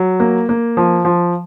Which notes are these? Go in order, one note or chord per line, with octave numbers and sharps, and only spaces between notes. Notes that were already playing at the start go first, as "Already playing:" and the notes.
Already playing: F#3
A#3
A#3
F3
F3